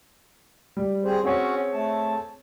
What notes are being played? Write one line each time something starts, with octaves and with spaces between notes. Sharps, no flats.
G3
C4 G#4 C5
C4 C#4 F#4 G#4 C#5
A3 A5